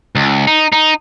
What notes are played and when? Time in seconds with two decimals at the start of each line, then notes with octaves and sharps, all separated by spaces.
0.15 C#2
0.47 D#4
0.72 D#4